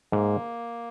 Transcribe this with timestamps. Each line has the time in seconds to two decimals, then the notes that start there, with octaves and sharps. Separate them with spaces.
0.12 G#2 A#3